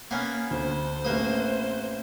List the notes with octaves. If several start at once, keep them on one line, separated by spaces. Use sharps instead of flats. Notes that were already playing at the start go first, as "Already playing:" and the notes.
A#3 B3 C#4
D2 C5
A1 A#3 C4 B4 D#6